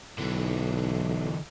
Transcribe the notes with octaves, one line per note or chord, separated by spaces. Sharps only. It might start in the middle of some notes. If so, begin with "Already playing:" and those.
B1 D3 E3